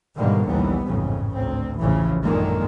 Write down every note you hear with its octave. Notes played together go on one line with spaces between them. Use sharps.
G#2 B2 D3 D#3 G3 A#3
A#1 D#2 E3 G3 B3
A1 F2 G#2 C#3
D2 C4
A1 C#3 E3 F3
F#2 A#2 D3 D#3 G#3 A#3